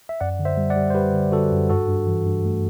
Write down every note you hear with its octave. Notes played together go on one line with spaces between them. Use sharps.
E5
F#2 D5 F#5
D3
C5 E5
G3
D5 F#5
G3
C5
G3 G4 B4
D3
D3 F#4 A4
F#2
G2 F#4 A4
G2
E3
G2
A3